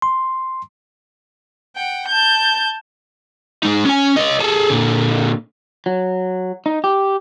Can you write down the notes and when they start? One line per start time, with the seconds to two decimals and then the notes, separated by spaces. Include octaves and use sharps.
0.02 C6
1.76 F#5 G5
2.08 A5 G6
3.63 G#3 D#4
3.85 C#4 G#5
4.16 C#5 D#5
4.40 G#4 A4
4.70 A#2 D3
5.86 F#3
6.66 D#4
6.84 G4